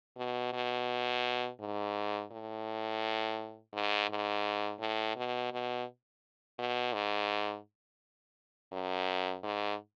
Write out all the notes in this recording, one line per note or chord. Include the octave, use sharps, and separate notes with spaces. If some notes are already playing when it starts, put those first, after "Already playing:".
B2
B2
G#2
A2
G#2
G#2
A2
B2
B2
B2
G#2
F#2
G#2